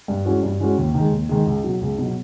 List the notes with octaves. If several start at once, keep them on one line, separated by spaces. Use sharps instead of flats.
G2
E3 G#3 C#4 F#4
G2
E3 G#3 C#4 F#4
D#2
D#3 G#3
D#2
D#3 G#3
C#2
B2 F#3
C#2
B2 F#3